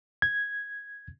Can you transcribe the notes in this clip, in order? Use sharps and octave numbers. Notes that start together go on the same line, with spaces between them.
G#6